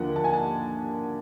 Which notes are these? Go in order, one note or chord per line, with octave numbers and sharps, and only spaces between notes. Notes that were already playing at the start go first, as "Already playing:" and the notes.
Already playing: D#2 D3 F3 A#3 F#5
A5
G#5
A5